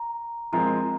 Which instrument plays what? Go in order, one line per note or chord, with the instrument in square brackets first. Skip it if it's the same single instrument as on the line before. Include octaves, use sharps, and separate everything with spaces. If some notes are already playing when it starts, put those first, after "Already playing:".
Already playing: [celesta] A#5
[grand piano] F3 G#3 C4 F4 A#4 [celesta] A#5